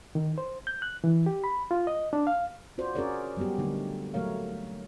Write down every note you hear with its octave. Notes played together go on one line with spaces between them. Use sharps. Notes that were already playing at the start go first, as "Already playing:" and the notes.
D#3
C5
G6
F#6
E3
G4
B5
F4
D#5
D4
F5
F4 F#4 C5 D5
C#4 F#4 G#4 A#4 C#5 D5
F#3 G3 B3 F#4 G4
D3 F#3 G3 A3 A#3 D#4
F#3 A3 A#3 A#4 C#5 F5